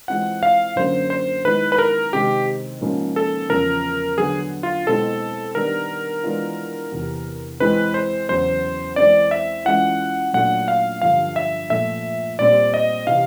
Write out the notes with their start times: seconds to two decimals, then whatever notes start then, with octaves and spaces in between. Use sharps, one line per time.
0.08 E3 G#3 C4 F4 F#5
0.43 F5
0.76 F#2 D3 F#3 A#3 C5
1.10 C5
1.44 D#3 G#3 B3 E4 B4
1.72 B4
1.78 A#4
2.13 C3 D#3 G#3 C4 D#4 G4
2.81 G#2 F3 A#3 C#4 F4
3.16 A4
3.49 E2 C#3 F3 A#4
4.18 D3 F#3 B3 G#4
4.63 F4
4.87 B2 G#3 C4 E4 A4
5.55 D#3 G3 B3 D4 A#4
6.23 E3 G#3 B3 D4 F4
6.92 E2 C3 E3
7.60 E3 G#3 C4 E4 B4
7.94 C5
8.29 E2 C#3 F#3 C5
8.96 E3 G#3 C4 D5
9.31 E5
9.65 E3 G#3 C#4 F4 F#5
10.33 A#2 F#3 A3 D4 F4 F#5
10.68 F5
11.02 G2 D3 F3 F5
11.36 E5
11.70 A#2 F3 A3 E5
12.39 A#2 G3 C4 D5
12.74 D#5
13.07 C3 E3 F5